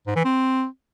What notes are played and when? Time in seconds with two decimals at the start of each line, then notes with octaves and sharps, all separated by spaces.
0.07 G#2
0.16 E3
0.25 C4